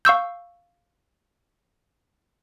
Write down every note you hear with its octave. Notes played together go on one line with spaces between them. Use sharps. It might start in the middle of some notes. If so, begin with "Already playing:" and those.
F5 C#6 E6 G6